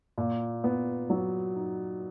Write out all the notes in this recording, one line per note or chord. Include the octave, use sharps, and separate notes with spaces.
A#2
B3
F#3
D#4